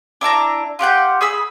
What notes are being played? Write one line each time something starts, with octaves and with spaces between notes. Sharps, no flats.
D4 E4 A5 A#5
F4 G4 F#5 G6
G#4 B5 E6